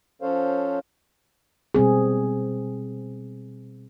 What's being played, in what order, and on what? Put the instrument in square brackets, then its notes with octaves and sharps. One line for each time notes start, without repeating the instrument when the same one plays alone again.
[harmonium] F3 C#4 A4 C5 C#5 F5
[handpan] B2 G3 C4 G#4